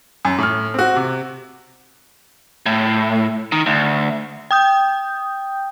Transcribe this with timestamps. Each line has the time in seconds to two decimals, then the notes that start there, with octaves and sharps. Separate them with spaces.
0.25 F#2
0.38 A2 F6
0.74 C4 F#4
0.96 C3
2.66 A2
3.52 D#3
3.66 D2
4.51 G5 D#6 G6